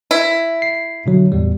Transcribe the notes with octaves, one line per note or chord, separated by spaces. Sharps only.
E4
C7
B2 D3 F#3
E2 A2 G3